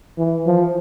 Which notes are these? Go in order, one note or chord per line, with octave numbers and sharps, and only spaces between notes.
E3
F3